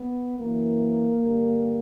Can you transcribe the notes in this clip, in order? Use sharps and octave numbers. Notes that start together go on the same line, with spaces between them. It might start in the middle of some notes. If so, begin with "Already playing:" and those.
Already playing: B3
F#2 E3 A#3
G2 D3